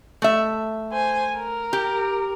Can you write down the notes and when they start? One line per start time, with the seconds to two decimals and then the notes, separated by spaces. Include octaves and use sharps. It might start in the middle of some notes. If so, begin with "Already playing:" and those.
0.22 A3 E5
0.92 C5 G#5
1.37 A#4
1.73 G4